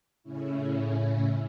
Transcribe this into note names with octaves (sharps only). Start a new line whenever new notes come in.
A2 C#3 C#4 E4